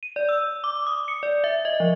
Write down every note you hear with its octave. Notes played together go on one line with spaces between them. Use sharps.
D#7
D5
E6
D6
D#6
C#7
D5
E5
D#5
F3